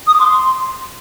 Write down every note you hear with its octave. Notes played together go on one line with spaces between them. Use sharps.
D#6
D6
C6